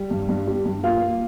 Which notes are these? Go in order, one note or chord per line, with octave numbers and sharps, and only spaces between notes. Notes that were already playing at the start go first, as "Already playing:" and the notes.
Already playing: G3
G2
G2
G3
G2
A#3 F4
A#3